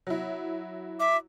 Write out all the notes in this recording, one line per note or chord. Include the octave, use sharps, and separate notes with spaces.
F#3 E4
E5 D6